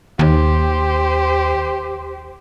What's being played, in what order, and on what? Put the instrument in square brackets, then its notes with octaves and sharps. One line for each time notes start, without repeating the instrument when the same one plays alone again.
[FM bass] D#2 [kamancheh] G4 C5